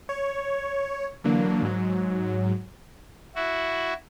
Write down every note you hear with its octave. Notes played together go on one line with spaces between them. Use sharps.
C#5
D3 E3 F#3 A#3 D4
G#2 F#3
E4 F#4